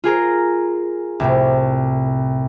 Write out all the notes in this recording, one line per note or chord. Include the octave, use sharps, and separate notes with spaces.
F4 G#4 A#4
C2 A2 C3